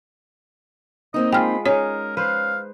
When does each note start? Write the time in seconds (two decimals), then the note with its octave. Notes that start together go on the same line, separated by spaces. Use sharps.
1.14 A#3 C4 D#4 D#5
1.33 G#3 F4 G5 B5 F6
1.66 C#4 D#4 G#4 A#4 C#5
2.17 B4 C5 F5